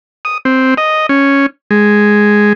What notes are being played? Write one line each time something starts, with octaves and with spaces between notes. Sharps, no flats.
D#6
C4
D#5
C#4
G#3